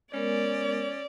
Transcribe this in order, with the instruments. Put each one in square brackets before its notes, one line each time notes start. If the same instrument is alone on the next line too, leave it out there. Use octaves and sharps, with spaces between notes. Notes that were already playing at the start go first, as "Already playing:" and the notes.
[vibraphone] G#3 B3 A#4 [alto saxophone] C#4 [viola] D5